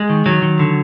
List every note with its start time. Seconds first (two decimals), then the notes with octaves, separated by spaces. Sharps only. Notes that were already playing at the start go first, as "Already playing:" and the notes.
Already playing: G#3
0.10 D#3
0.26 D#3 F#3
0.42 D#3
0.59 D3